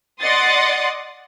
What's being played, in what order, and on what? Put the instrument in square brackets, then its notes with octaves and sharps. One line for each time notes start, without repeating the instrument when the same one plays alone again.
[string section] D5 D#5 F#5 C6 D#6 A6